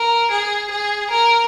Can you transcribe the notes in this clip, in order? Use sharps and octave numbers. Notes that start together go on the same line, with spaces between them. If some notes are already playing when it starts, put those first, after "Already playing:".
Already playing: A#4
G#4
G#4
A#4